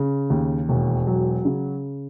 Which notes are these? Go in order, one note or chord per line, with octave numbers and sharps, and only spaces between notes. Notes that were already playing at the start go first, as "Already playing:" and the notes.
Already playing: C#3
D#2
E1
F#3
C#3